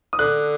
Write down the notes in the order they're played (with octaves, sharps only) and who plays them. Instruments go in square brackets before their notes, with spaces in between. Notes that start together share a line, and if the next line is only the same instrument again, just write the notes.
[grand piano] D#6
[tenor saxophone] D3 [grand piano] F#6